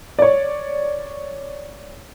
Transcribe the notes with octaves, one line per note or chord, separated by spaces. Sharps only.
C#5 D5